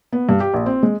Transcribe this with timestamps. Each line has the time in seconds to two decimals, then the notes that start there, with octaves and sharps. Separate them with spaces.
0.12 B3
0.29 G2
0.40 G4
0.54 A#1
0.66 C4
0.83 G#3